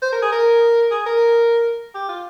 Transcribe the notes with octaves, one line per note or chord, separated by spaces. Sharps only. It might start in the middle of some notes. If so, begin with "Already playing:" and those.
C5
A#4
G#4
A#4
G#4
A#4
G4
F4